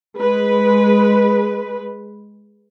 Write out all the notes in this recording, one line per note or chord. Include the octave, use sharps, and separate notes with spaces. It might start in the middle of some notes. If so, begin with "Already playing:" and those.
G#3 B4